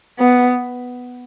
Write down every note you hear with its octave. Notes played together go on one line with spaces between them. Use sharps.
B3